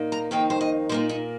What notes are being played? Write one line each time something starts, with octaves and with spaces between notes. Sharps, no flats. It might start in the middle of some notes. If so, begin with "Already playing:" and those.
Already playing: A#2 A#3 D#4
A#5
F2 D#3 A#3 D#4 G5
C5
D#5
A#2 A#3 D#4 C5
D#4